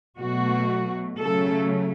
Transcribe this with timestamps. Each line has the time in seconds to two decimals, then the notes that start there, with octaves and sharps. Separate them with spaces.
0.19 B2 F#3 A3 F#4
1.20 C#3 F#3 A3 A4